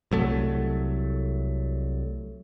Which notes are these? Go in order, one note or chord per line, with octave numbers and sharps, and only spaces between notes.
C2 F#3 A3